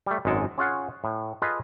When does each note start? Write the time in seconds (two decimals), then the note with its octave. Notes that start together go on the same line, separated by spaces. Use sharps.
0.06 G3 A3
0.25 G#1 F#2 G#3 A4
0.58 C#4 F4 G#4 F5 F#5
1.04 A2
1.42 F4 G#4 A4 B4 D#5 F5